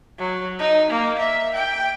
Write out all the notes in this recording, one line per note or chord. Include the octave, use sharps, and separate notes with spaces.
F#3
D#4
A#3
E5
G5